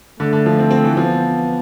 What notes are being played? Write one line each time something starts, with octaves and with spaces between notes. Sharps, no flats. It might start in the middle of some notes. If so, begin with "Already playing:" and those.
D3 A3
D3
F3
C4
C4
E3
F3 B3